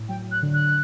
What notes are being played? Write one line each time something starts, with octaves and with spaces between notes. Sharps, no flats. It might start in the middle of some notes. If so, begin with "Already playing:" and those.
Already playing: A2
F#3 G5
F#6
D3
F#6